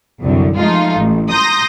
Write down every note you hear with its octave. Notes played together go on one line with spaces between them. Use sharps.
C2 F#2 D3
F3 G#3 A3 D#4 F4
A1
A#5 C6 D#6 G6 A#6